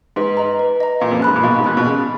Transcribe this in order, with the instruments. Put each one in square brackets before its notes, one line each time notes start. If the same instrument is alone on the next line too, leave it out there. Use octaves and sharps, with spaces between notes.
[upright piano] G#2 [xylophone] B4
[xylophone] D#5 A#5
B4
D#5 A#5
[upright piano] A#2 [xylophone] F5
[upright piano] F2
F#2
[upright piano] G#2 [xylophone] B5 F#6
[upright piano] A#2
[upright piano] B2 [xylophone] F5
[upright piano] G#2
[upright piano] A#2 [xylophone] B5 F#6
[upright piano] B2
[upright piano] C#3 [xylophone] G#4